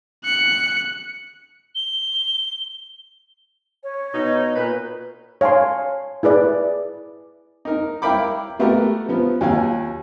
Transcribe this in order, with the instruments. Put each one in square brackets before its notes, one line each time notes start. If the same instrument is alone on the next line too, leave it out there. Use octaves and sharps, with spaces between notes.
[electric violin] F#6 C#7
[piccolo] G7
[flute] C#5
[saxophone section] B2 D#4
[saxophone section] A#2 B4 [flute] A#4
[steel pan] C#5 F5 G#5 A5 C6
E4 G#4 B4 D5
[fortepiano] D#4 A#4
E4 A#4 F5 G5 B5 D6
G3 A3 B3 F#4 G4 A#4
F3 B3
D#2 F#3 F4 F5 G#5